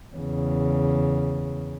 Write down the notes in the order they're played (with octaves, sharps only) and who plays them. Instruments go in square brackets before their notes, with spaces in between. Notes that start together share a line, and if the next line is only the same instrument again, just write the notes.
[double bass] E2 C#3